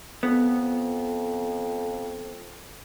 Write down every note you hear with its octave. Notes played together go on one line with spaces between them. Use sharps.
F2 B3